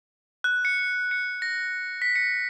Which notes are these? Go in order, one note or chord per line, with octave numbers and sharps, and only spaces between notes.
F#6
C#7
C#7
A#6
B6
C#7